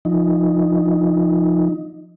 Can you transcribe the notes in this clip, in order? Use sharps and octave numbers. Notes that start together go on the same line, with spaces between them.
F3 D#4